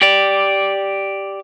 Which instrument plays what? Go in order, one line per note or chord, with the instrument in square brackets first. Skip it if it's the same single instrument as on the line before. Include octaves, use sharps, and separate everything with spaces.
[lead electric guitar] G4 D5